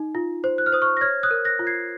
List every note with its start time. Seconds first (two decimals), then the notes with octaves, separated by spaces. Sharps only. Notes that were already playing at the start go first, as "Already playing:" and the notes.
Already playing: D#4
0.15 F4
0.44 C5
0.58 F#6
0.66 F6
0.72 C5 D#6
0.82 C#6 F6
0.97 A#6
1.01 C#5 F6 G#6
1.23 D#6 F#6
1.31 A#4
1.45 F#6 A#6
1.59 F4
1.67 G#6 C7